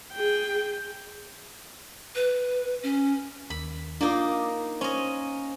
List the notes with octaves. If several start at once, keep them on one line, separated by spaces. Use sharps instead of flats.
G#4 G5
B4
C#4
D#2 B5
A#3 D4 D#4 F4 D6
C#4 C5 D#5